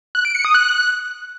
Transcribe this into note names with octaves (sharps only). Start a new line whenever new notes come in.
F#6
D7
C#7
D#6
F#6